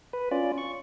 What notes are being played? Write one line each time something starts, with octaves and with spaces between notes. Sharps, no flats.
B4
C#4 F4 D5
C#6